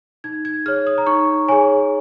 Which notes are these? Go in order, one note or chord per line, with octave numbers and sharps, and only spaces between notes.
D#4 G#6
G#6
G#4 C#5 F6
D#6
A#5
D#4 C#6
G#4 C#5 G#5